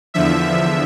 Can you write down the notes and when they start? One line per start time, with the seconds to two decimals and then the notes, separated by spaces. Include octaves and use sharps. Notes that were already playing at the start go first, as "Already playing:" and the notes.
0.14 E2 D3 F3 E5